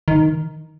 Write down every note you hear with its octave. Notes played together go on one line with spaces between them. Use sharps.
D#3